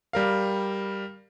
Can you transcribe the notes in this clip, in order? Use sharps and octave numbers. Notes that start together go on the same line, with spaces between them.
G3 A#4 F5